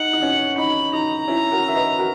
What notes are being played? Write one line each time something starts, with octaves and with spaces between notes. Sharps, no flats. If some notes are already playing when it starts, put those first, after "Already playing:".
Already playing: D#4 F#5
D#4
C#4
D#4 B5
D#4 A#5
C#4 E4
F#4 A#4
E5
B4 D#5
F#4 A#4